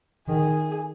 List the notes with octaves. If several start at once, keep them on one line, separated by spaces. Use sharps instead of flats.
D#3 G#4